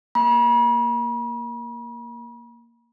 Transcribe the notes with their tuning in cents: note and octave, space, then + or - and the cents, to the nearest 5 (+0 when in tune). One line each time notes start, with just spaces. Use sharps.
A#3 +0 B5 -45